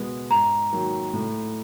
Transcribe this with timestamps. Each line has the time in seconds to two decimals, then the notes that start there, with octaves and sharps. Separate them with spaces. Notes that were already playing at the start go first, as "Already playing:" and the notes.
Already playing: B2 G#3 B3
0.31 G#2 A#5
0.72 D#3 F#3 A#3
1.14 A2